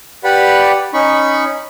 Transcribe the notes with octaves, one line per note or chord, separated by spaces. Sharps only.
G4 B4 D5 F#5 B5
C#4 D#4 B5 C#6